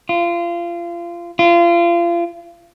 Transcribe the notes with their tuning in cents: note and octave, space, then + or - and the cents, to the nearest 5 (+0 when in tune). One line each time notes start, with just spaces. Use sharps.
F4 -25
F4 -30